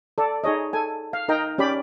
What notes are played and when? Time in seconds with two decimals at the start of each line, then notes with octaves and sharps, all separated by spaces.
0.18 A4 D5
0.44 D#4 G#4 C#5 D#5
0.73 A4 G#5
1.13 F5
1.29 D#4 A#4 D#5 G5 A#5
1.58 C#4 G4 D5 B5